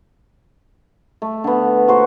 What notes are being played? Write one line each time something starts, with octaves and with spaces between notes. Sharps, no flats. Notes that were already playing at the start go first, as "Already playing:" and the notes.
A3
D3 B3
A#3 F#4 C5